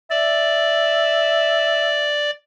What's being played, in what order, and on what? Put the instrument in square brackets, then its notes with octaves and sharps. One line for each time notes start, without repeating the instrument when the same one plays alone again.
[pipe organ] D5 [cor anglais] E5